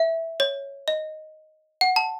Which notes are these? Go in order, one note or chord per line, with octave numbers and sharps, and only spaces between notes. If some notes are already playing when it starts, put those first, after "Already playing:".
Already playing: E5
C#5
D#5
F#5
A5